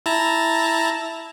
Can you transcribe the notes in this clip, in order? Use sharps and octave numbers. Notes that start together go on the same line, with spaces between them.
E4 A5 A#5